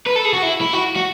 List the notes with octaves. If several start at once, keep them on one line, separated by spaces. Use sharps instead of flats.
B4
A4
G#4
F#4
E4
E4
F#4
F#4